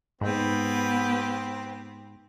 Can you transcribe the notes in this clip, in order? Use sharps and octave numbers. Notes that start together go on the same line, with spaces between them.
G#2 B3 C4 G4 B4